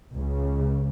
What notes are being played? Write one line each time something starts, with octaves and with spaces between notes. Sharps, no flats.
C#2 C#3